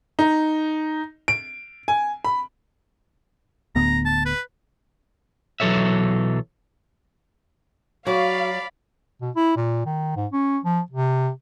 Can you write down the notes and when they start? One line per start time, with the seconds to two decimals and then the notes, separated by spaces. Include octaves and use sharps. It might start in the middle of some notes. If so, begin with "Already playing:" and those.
0.19 D#4
1.28 D7
1.88 G#5
2.25 B5
3.75 D1 D2 B3 A#5
4.05 A5
4.25 B4
5.60 B1 E3 F#3 A4 C#5 E5
8.06 F#3 F#4 D5 F5 B5
9.21 B2
9.36 E4
9.57 A#2
9.86 D#3
10.16 G#2
10.32 C#4
10.64 F3
10.90 C3